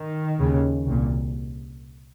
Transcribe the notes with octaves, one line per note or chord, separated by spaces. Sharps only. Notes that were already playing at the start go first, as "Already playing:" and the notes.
Already playing: D#3
D#2 C#3
C2 A#2